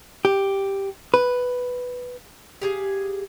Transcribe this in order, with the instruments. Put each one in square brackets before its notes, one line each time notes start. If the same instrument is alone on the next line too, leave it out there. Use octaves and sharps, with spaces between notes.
[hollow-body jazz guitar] G4
B4
[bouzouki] G4 G#4 F5